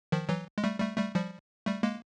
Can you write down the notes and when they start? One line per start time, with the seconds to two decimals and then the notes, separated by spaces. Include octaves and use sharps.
0.12 D#3 F3
0.29 E3 F#3
0.58 G#3
0.64 G3 A3
0.80 G3 A3
0.97 G3 A3
1.15 F3 G3
1.66 G3 A3
1.83 G#3 A#3